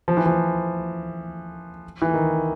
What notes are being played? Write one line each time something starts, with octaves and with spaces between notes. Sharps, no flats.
F3
E3
F3
E3
D#3